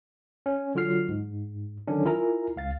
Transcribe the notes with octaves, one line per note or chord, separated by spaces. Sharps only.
C#4
D3 F#3 F4 F#4 F6 C7
G#2
D3 D#3 F#3 C#4 D4
E4 F4 A#4 G#5 A#5
C#2 F5 A6